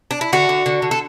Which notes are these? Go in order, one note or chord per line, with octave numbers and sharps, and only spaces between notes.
D4
E4
D3 F#4
D3
D3
D3
A4